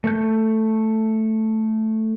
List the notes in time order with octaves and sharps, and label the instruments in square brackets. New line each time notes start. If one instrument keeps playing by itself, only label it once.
[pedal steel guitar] A3 G6